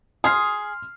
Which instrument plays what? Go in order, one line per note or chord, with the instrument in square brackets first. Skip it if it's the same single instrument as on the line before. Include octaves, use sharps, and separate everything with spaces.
[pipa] G#4 [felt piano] C6 F6 C7